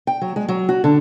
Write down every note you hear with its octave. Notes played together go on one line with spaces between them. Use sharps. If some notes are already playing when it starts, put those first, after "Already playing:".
G5
F#3
G#3
F#3
F#4
D3